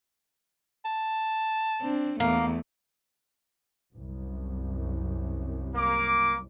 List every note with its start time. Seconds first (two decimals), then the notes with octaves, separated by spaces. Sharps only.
0.85 A5
1.81 C4 D4
2.20 E2 A3 A#3
3.94 C2 F#2
5.76 A#3 D6